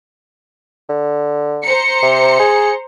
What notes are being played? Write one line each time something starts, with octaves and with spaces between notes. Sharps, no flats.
D3
C5 A#5 C#7
C3
G#4